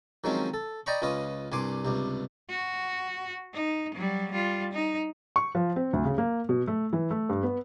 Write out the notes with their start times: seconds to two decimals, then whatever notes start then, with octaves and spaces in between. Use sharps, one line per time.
0.24 D#3 F3 F#3 G#3 C4 C#4
0.54 A4
0.86 D5 D#5 G5 A#5 B5 C#6
1.02 C#2 C#4 F4 B4 D#5
1.52 C2 G2 G#5 C6 D6
1.85 C#2 G2 C3
2.49 F#4
3.54 D#4
3.95 F#3 G3
4.31 G3 F4
4.73 D#4
5.36 C#6
5.55 F3
5.76 C4
5.93 D2
6.05 C#3
6.18 A#3
6.49 B2
6.67 A3
6.93 E3
7.11 A3
7.29 G2
7.43 B3